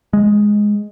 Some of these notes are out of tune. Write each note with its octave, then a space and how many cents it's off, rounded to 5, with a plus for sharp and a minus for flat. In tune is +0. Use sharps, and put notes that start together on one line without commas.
G#3 +0